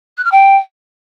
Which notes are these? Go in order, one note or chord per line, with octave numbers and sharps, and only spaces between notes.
F#6
F6
G5